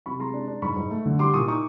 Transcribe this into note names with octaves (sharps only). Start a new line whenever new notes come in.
C3 B5 C#6
G#3 A#5 C6
D4
D4
G#2 B5 C#6
G#2
A3
D3
G3 C6 D6
A#2 C#6 D#6
D#4 C#6 D#6